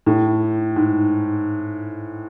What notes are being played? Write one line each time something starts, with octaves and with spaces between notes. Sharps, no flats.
A2
G#2